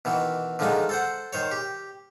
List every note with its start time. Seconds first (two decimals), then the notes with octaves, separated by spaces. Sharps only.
0.05 B2 D#3 E3
0.59 D3 D#3 F3 G#3 D#4
0.89 A4 C5 F#5
1.33 D#3 C5 C#5
1.51 G4